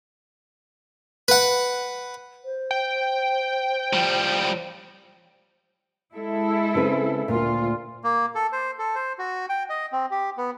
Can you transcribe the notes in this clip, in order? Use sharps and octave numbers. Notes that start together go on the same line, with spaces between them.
B4 F#5
C5
G5
F3 G3
G#3 E4 A4
C#3 C4 B4
D2 A#2 F4
A#3
A4
C5
A4
C5
F#4
G5
D#5
C4
G4
B3